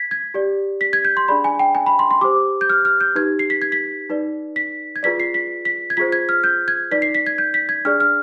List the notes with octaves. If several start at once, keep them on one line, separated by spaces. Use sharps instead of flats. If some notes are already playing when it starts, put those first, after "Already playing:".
Already playing: G#6 B6
G#6
G4 D5
B6
G#6
G6
C6
D4 G#4 D5 B5
G#5
G5
G#5
B5
C6
C6
G4 C5 D6
G6
F6
F6
G6
D#4 G4 B4 G#6
C7
B6
G#6
B6
D#4 B4 D5
B6
G#6
F4 G#4 B4 D5 B6
C7
B6
B6
G#6
F4 G#4 C5 B6
G#6
F6
G6
G#6
D#4 B4 D5 B6
C7
B6
G#6
G6
B6
G#6
D4 G#4 D5 F6
F6